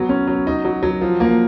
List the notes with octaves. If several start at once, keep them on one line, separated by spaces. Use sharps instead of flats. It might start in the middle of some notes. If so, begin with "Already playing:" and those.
Already playing: F#3 B3
C#4
F#3
D#4
F#3
F#3
F3
A#3